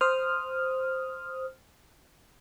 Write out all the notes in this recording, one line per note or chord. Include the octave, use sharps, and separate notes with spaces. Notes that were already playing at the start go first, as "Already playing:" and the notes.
C5 D#6 F6